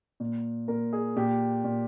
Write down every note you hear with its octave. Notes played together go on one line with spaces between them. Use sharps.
A#2
A#2 A#4
G#4
A#2 G4
A#2